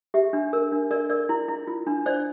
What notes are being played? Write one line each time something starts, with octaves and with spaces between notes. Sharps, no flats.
G4 E5
D4
A#4
D4
A#4 D5
A#4 D5
E4
E4
F4
D4
C5 D5